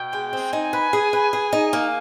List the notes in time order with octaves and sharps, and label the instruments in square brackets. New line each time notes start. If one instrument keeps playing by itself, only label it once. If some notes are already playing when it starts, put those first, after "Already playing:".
Already playing: [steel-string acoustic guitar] B2 [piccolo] G5
[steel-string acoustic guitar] G#3
C4
[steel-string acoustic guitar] D#4 [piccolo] G#5
[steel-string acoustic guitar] B4
G#4
B4
G#4
D#4
A#3